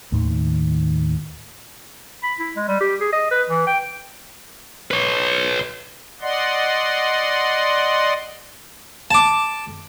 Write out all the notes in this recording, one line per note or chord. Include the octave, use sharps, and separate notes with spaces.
D#2 A2 D#3
B5
E4
G#3
G3
G4
G#4
D#5
B4
E3
G5
B4 C#5
D5 D#5 F#5 C6
A5 D6